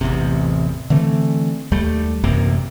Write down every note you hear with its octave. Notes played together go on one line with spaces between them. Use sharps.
A1 E2 C3
D3 E3 A3 C4
D#2 G3 A3
A1 F#2 C3 A#3